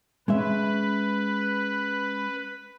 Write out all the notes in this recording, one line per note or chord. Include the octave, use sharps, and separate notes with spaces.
G#3 C#4 B4 E5